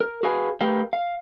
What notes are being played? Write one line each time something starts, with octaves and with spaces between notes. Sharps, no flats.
A#4
F#4 G#4 B4 F5 G#5
A3 G4 A#4 B4 F5 G5
F5